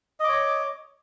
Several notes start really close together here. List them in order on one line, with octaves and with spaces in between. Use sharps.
D#5 D6 C#5